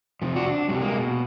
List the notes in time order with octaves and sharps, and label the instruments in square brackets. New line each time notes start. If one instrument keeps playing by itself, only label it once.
[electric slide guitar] C3 F3
F#4 D5 F#5
D4
C3 F#3 G3
G#3 A#3
B2